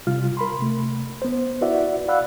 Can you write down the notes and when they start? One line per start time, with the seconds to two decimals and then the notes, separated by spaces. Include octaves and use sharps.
0.07 C3 G3 F4 F6
0.37 A#4 B5 C6
0.59 C3 A3
1.22 B3 C5
1.61 E4 F#4 B4 D5 E5 F#5
2.08 D5 F5 F#5 B5 E6 F#6